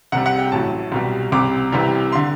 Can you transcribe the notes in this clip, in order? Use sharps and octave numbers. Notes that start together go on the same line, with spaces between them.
C2 C3 G3 F#5
F#5
G5
A1 A2 F#3 A5
C2 B2 G3
C2 C3 G3 D6
C2 C3 E3 G3
D3 C6